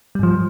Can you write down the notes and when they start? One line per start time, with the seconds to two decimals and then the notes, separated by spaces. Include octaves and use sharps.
0.15 G3
0.19 G#2
0.23 F3